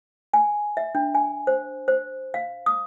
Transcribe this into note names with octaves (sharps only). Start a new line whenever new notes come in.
G#5
E5
D4
G#5
C5
C5
F5
D#6